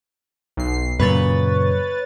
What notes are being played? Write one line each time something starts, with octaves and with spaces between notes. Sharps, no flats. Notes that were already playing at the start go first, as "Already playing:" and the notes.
B1 C7
F#2 A#2 C#3 B4 C#5 A6